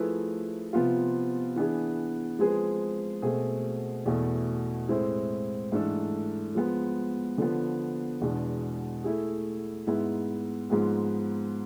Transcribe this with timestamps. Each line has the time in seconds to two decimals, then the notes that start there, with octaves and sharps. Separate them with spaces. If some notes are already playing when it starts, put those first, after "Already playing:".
Already playing: F3 A3 E4 G#4 B4
0.73 C3 F3 B3 F4
1.56 E3 B3 D4 G#4
2.39 F3 G#3 C4 G#4 B4
3.22 B2 A3 C4 G#4
4.06 E2 B2 A3
4.89 A2 G#3 C4 E4
5.72 G#2 E3 A3 D4 A4
6.55 F3 G#3 B3
7.38 D3 F3 B3
8.21 E2 B2 G#3 D4
9.04 A3 E4 G#4
9.87 G#2 G#3 B3 E4
10.70 G#2 F3 G#3 B3